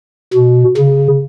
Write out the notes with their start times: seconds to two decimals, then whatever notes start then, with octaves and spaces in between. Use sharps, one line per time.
0.33 B2
0.77 C#3